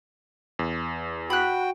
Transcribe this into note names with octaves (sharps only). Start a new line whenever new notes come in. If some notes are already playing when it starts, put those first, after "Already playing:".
E2
F#4 G5 B5 F#6